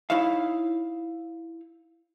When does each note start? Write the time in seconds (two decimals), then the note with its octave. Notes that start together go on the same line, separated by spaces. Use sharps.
0.10 D#4 E4 C#5 E5 F5